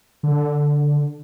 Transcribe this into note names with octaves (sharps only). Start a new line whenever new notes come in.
D3